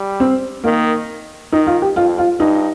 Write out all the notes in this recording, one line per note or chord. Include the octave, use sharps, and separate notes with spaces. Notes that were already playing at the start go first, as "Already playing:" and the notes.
Already playing: G3
C4
D#3 A#3
D#3 D#4
F4
G4
F2 F4
F4
G2 D#4